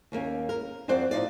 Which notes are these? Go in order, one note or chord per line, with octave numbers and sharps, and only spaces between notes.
D#2 A#3 C#4
A#4
F2 C4 C5 D5 F#5
A2 D#4 F4 D5